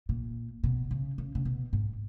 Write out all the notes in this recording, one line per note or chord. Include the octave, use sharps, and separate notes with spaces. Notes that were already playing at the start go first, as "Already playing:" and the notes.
A#2
B2
C#3
C#3
C#3
B2
G#2